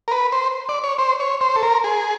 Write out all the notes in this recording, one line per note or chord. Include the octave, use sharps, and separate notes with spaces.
A#4
B4
C5
D5
C#5
C5
C#5
C5
A4
A#4
G#4